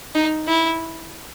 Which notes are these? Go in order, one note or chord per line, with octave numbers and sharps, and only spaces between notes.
D#4
E4